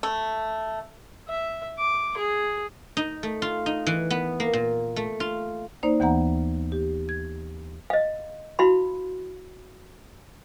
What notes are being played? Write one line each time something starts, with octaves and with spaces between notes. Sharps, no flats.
A3
E5
D6
G#4
D#4
A3
F4
D#4
E3
B3
A#3
A#2
A3
F4
A#3 D#4 C5 D5
D#2 E3 B3 F#5 A#5
G4
G#6
D#5 F5
E4 F#4 F5 B5 C6